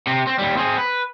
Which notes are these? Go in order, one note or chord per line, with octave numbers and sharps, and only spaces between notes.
C3 C4
C4
D#2 G3
C4 G#4
B4